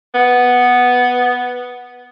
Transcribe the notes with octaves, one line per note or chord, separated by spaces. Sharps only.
B3